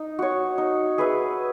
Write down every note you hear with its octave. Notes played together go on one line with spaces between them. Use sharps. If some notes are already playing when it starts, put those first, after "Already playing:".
Already playing: D#4
F#4 C#5
D#4
G#4 B4 E5